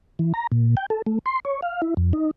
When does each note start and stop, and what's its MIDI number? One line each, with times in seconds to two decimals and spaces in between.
0.19 0.33 52
0.34 0.47 82
0.52 0.75 46
0.77 0.86 79
0.90 1.02 69
1.07 1.19 57
1.26 1.40 84
1.45 1.61 73
1.62 1.81 77
1.82 1.94 64
1.97 2.13 41
2.13 2.31 63